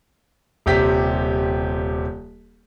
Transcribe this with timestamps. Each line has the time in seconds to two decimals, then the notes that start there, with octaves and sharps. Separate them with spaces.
0.66 D#1 C3 G4 B6